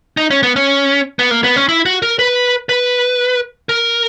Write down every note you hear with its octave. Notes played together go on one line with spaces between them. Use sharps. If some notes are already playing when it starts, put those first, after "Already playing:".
D#4
C#4
B3
C#4
B3
A#3
B3
C#4
E4
F#4
A#4
B4
B4
A#4